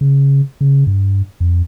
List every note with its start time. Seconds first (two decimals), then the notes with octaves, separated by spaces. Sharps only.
0.01 C#3
0.61 C#3
0.87 G2
1.40 F2